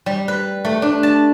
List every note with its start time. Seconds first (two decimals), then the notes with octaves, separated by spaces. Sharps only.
0.06 G3
0.28 B4
0.65 A3
0.82 D4
1.03 A5